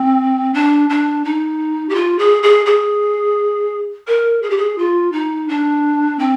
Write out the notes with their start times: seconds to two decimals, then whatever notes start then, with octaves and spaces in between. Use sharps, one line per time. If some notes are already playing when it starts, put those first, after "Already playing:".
Already playing: C4
0.54 D4
0.90 D4
1.25 D#4
1.89 G4
1.95 F4
2.19 G#4
2.43 G#4
2.66 G#4
4.08 A#4
4.42 G#4
4.50 G4
4.57 G#4
4.78 F4
5.12 D#4
5.49 D4
6.19 C4